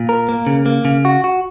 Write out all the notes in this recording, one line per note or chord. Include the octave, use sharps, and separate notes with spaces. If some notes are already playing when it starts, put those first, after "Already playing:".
Already playing: A#2
A#4
A#3
C#3
A#3
C#3
F#4
F#4